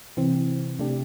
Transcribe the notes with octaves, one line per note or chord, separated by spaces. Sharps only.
C3 E3 C4
C3 A3 D4 G4